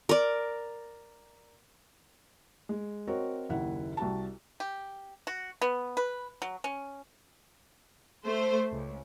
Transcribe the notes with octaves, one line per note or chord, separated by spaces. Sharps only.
A#4 D5
G#3
C4 F#4 A#4 C#5 D#5
F#1 D#2 E4 F#5
C2 F#4 A5
G4
F#4
B3
B4
F#3
C#4
A3 C5
C#2